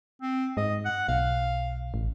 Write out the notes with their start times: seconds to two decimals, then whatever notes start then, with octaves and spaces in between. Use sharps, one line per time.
0.22 C4
0.57 G#2 D#5
0.85 F#5
1.08 B1 F5
1.94 A1